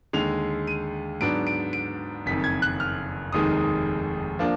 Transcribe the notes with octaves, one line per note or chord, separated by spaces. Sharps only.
D#2 D3 G#3 F7
D#7
G#2 F#3 B3 D4 D7
D7
D7
F#1 F2 D#3 B6
G#6
F#6
F6
F1 D#2 D#3 G#3 D#6
F3 A#3 D4